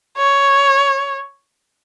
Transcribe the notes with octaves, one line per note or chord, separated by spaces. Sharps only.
C#5